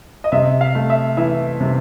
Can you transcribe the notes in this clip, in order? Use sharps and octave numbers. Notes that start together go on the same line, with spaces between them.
D#5
C3 E5
F5
A3
E5
E3 E5
C3